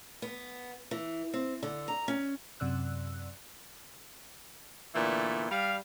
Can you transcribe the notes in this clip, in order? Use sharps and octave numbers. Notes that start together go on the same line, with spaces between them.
B3
E3
C4
D3
A#5
C#4
F#2 C3 D5 E6 F#6
A#2 D3 E3 A3 B3
G3 F5